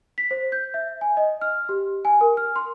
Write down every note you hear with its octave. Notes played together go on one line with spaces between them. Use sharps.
B6
C5
G6
E5
G#5
D#5
F6
G4
G#5
A#4
F6
C6